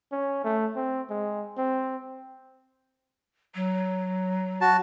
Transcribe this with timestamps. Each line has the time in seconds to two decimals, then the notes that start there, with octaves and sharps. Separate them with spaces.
0.12 C#4
0.44 A3
0.76 C4
1.10 G#3
1.57 C4
3.55 F#3
4.61 F#4 A5